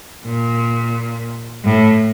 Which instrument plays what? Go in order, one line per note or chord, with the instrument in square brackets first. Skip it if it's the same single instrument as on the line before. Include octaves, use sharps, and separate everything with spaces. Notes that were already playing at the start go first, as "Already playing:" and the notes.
[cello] A#2
A2